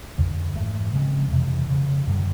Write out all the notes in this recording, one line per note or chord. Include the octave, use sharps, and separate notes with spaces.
F2 D3 F3
G#2 E3 A3
C#3 F3 G#3 C4
F2 C3 E3
C#3 F3 A3
F#2 D3 G3